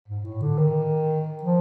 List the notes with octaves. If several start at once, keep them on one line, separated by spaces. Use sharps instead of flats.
G#2
A2
D3
D#3
F3